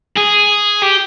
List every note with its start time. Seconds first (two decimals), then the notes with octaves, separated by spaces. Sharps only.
0.17 G#4
0.83 G4